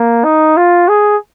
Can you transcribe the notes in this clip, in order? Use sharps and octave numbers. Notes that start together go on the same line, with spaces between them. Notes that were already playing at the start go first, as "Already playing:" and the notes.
Already playing: A#3
D#4
F4
G#4